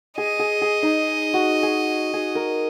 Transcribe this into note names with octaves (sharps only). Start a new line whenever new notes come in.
G#4 D#5
G#4
G#4
D#4
F#4
G#4
G#4
A#4